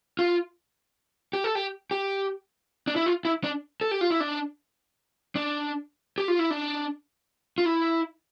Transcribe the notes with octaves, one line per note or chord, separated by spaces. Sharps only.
F4
G4
A4
G4
G4
D4
E4
F4
E4
D4
A4
G4
F4
E4
D4
D4
G4
F4
E4
D4
F4
E4